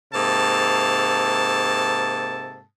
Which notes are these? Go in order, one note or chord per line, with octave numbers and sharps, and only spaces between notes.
G#2 C3 A#3 A4 A5